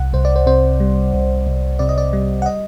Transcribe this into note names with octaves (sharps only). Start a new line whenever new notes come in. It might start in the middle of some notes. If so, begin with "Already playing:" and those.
Already playing: C2 F#5
C2 C5
D5
C5
C3 C5
G3
C2
C2
C3 D5
D#5
D5
G3
F#5
D#5